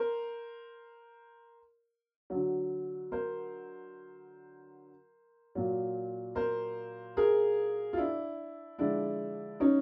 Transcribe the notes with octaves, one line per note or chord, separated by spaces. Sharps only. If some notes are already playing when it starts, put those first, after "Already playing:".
Already playing: A#4 C5
D3 F#3
A#4 C5
A#2 F#3
A#4 C5
G#4 A#4
F4
D4 E4
D3 F3 G#3 D4 E4
C#4 D#4